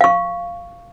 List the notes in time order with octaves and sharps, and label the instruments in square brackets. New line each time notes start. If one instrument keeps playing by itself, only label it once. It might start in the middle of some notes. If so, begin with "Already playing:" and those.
[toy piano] F5 C#6